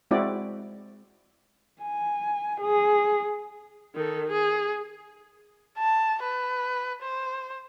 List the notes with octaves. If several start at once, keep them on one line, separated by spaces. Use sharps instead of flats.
G#3 C4 E4 F#4 D5
G#5
G#4
D#3 A4
G#4
A5
B4
C5